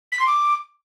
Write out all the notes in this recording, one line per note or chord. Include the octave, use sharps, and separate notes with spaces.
B6
C6
D6